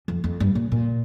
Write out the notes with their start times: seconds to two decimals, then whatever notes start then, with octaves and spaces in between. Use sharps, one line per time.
0.08 F2
0.24 F2
0.40 G2
0.55 A#2
0.72 A#2